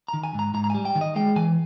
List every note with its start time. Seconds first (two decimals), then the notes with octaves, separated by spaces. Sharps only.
0.08 A#5
0.14 D#3
0.24 G#5
0.34 G#2 A#5
0.54 G#2 A#5
0.64 A#5
0.70 G3 G#5
0.85 G5
0.95 D#3
1.01 D#5
1.16 G#3 G5
1.36 E3 G#5